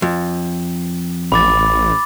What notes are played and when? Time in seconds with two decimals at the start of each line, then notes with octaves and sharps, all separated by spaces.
0.02 F2
1.32 A1 B5 D6 A6